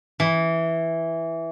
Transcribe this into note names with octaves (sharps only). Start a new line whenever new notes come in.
E3